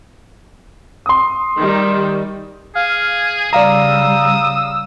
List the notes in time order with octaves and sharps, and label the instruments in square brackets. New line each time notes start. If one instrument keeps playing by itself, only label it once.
[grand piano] C6 D#6
[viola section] D#3 G3
[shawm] G#4 [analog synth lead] F5
[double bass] C#3 G3 [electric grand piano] D5 F5 A#5 [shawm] D#6 [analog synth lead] E6